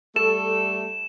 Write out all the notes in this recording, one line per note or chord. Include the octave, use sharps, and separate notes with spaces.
G3 A3 A4 E7